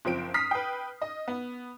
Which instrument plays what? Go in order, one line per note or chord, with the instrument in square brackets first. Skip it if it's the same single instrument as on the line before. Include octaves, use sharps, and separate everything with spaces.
[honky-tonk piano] F#1 F3 C4 D7
D#6 F6 B6 C7
B4 G5
D#5
B3